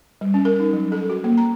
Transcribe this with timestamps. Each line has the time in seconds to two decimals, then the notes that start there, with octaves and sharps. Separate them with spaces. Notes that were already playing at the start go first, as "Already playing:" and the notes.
0.21 G3
0.34 C#4
0.45 A#4
0.60 D#4
0.73 F#3
0.92 A4
1.10 F#4
1.24 A#3
1.37 A#5